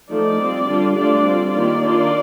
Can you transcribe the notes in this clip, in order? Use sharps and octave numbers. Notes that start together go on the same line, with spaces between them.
F3 A3 D#4 D5
G3 C4 F4
D3 G3 D4 F4
D3 A3 D4 F4 D5
G3 C4 F4
D#3 A#3 F4 D5
D#3 A#3 D4 F4